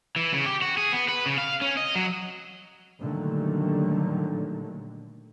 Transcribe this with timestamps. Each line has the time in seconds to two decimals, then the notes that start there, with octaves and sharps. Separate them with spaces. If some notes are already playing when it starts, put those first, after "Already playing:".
0.16 E3
0.33 C#3
0.46 G4
0.62 F#4
0.78 G#4
0.93 B3
1.08 B4
1.26 C#3
1.38 F5
1.62 C#4
1.77 D#5
1.96 F#3
3.02 A#2 D3 D#3 F#3 G3 A3